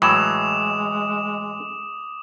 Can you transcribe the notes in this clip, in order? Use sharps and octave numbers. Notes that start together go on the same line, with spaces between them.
A2 E3 F#3 G#3 D6 D#6 E7